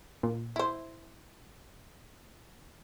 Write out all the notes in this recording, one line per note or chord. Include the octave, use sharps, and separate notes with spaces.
A#2
E4 C5